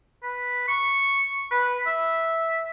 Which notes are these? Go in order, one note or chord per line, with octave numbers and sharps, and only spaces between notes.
B4
C#6
B4
E5